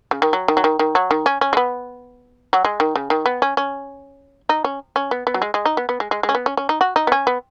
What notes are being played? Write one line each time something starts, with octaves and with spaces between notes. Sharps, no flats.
C#3
D#3
F#3
D#3
F#3
D#3
D#3
F#3
D#3
C#4
C#4
G#3
B3
F#3
G#3
D#3
C#3
D#3
B3
C#4
C#4
D#4
C#4
C#4
B3
B3
F#3
G#3
G#3
D#4
B3
B3
G#3
G#3
G#3
C#4
B3
C#4
C#4
D#4
F#4
D#4
B3
C#4
B3